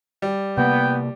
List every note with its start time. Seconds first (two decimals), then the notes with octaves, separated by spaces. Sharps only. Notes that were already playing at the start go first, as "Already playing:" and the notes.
0.22 G3
0.57 C3 A#3 B3 G5